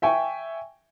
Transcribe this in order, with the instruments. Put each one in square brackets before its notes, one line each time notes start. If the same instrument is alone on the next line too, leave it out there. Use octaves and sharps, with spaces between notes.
[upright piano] E5 G5 G#5 C#6